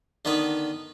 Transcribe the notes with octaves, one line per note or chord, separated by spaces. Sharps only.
D3 D#3 B3 B4